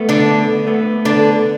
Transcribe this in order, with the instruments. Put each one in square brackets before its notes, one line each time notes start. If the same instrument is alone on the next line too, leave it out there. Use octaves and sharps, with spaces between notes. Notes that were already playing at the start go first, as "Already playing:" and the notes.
Already playing: [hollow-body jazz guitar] A3 B3
[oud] D3 D4
[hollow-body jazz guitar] A3 B3
[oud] D3 D4